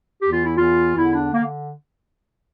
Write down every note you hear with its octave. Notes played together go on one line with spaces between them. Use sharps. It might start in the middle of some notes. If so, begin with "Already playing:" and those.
E2 E3 G4
F4
E4
E2 E3 F4
E2 D3 E4
D4
D3 A#3